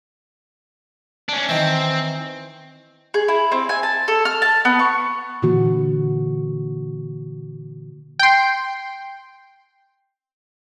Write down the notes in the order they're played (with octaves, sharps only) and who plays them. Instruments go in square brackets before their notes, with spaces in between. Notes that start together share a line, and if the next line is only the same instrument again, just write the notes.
[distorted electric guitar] C#4 D4
[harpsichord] D#3 E3 [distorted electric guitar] C4
[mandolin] G#4
E4
C4
G#5
A5
A4
F6
A5
B3
C#6
[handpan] A#2 D3 E3 A#3 F#4
[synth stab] G5 C6